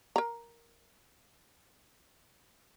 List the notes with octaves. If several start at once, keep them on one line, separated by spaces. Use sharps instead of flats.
A#4 A#5